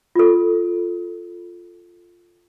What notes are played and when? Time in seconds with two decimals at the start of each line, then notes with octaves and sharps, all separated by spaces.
0.15 F4 A4